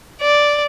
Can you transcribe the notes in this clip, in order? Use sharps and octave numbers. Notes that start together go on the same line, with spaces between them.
D5